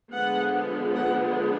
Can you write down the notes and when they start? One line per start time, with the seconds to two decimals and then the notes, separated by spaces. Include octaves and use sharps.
0.12 D3 F3 G#3 B3 F#5
0.95 F#5